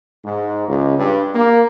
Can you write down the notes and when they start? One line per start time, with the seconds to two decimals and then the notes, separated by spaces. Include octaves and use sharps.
0.25 G#2
0.68 C#2
0.98 G2
1.34 A#3